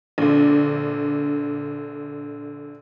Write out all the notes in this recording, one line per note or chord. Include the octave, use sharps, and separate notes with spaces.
A#1 D3